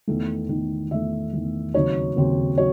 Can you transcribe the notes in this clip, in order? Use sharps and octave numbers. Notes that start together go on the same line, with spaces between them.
E2 D#3 A3
E2 D#3 A3
E2 D#3 A3 E5
E2 D#3 A3
D#2 C#3 F#3 C4 D#4 C#5
D#2 C#3 F#3 C4 D#4
F#3 C#5